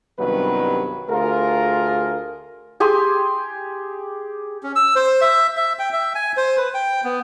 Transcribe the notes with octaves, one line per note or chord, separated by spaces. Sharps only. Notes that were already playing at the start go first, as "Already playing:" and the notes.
C2 G2 D#3 F#3 B3 B4
D2 A3 F4 G#4 A#4
G4 G#4 C6
C#4
E6
C5
E5
E5
G5
E5
G#5
C5
B4
G5
B3